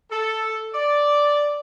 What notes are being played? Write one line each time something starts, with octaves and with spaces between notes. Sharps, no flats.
A4
D5